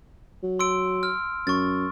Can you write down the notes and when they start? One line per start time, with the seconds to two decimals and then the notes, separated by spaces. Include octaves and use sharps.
0.43 F#3
0.59 C6 E6 D7
1.03 F6
1.47 F#2 C#6 A6